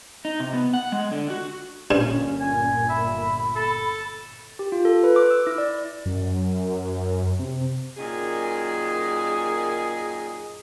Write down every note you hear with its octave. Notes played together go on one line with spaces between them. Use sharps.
D#4
C3
B3
F#5
G#3
D3
F#4
G1 G2 A#2 C#4
G#5
E5 B5
A4
G4
F4
A4
B4
D6
E6
E4
D5
F#2
C3
F#2 A#2 D#3 G#4